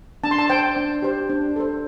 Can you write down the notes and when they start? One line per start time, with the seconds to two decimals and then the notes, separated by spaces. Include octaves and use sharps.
0.24 D4 A5
0.31 C6
0.39 A5
0.50 C5 G5
0.76 D4
1.02 G4 C5
1.30 D4
1.56 A4 C5